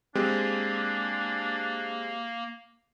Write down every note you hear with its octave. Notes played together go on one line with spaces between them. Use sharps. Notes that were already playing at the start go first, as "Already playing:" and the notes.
G#3 A#3 C4 D4 G4